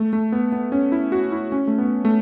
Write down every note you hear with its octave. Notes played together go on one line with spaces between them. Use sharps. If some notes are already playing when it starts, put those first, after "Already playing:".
Already playing: A3
A3
B3
B3
C#4
E4
F#4
E4
C#4
A3
B3
A3